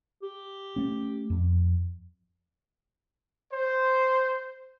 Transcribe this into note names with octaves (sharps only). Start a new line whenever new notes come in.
G4
A3 C#4
F2
C5